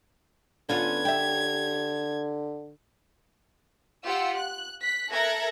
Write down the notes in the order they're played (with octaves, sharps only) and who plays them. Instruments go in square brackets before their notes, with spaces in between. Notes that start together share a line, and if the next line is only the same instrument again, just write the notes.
[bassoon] D3 [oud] B3 C#4 F4 [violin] G#6
[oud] G4 E5
[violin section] F4 G4 F#5 E6
F#6
F#6 B6
A4 A#4 E5 F#6 G#6 A#6